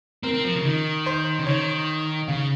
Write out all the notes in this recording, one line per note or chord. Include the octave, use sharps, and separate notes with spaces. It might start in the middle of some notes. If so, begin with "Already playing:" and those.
C4 A#4
C4
F3
C#3
D#3
C5
C#3
D#3 C#5
C#3 F5